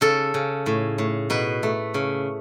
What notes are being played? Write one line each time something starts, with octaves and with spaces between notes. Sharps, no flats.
C#3 A4
C#3
A2
A2
B2 B4
A3
C#3